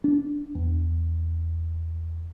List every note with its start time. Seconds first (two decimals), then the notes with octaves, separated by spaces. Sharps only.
0.04 D4
0.55 E2